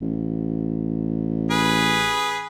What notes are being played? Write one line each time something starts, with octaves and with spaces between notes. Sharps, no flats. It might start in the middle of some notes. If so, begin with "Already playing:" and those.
A1
G#4 B4